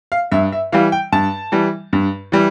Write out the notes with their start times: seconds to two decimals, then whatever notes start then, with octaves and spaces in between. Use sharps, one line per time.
0.12 F5
0.32 G2 E5
0.52 E5
0.72 E3 G3 F5
0.92 G5
1.12 G2 A5
1.52 E3 G3
1.93 G2
2.32 E3 G3